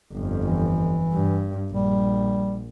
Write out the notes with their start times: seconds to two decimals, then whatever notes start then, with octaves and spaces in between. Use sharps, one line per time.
0.12 G1 F2
0.45 E3
1.13 G2
1.72 A#1 G3